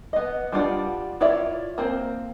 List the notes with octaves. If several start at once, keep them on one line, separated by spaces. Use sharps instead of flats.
B3 D#5
G3 D4 F4 F#5
E4 F4 C#5 D5 E5
A#3 C4 C5